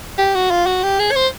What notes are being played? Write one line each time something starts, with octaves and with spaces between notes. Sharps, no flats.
G4
F#4
F4
F#4
G4
G#4
C#5
C5